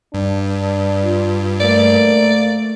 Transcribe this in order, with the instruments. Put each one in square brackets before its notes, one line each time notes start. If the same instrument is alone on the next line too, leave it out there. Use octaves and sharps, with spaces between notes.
[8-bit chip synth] G2 [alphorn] D4
[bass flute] F4
[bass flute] A3 [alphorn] A#3 [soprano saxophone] D5